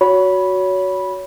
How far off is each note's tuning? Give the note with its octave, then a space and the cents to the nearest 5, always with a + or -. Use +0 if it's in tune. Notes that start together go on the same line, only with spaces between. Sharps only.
F#4 +0 C#5 +25 B5 -10